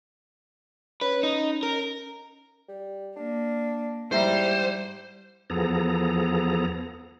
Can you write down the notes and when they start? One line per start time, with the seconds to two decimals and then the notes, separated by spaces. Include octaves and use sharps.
1.01 C#4 B4
1.23 D#4
1.63 A#4
2.68 G3
3.16 A#3 D4
4.12 G#2 G3 E4 G4 C5 E5 A#5
5.50 E2 F3 B3 G#4 A4 A#5